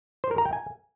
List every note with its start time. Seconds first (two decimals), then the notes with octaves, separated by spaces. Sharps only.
0.24 C5
0.31 A#4
0.38 A#5
0.45 G5
0.53 G#5